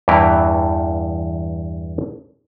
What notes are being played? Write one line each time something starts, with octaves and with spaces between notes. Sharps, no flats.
E2 G2 E3 E4 G5 A#5